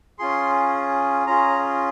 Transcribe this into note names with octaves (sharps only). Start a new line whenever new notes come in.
C#4 F4 G#4 C6
C#4 F4 G#4 A#5